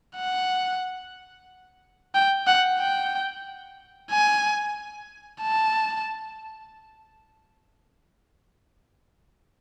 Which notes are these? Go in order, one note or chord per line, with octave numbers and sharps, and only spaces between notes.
F#5
G5
F#5
G5
G#5
A5